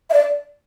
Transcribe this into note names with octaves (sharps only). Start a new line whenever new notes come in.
E5
D5